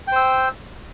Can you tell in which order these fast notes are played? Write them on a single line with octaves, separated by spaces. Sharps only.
G5 C5 E6